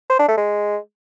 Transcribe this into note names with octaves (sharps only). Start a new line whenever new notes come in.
C5
D4
A3
G#3